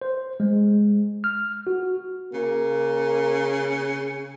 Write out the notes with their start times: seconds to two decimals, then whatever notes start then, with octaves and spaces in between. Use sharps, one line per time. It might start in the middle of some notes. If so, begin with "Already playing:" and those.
0.02 C5
0.40 G#3
1.24 F6
1.67 F#4
2.33 C#3 A#3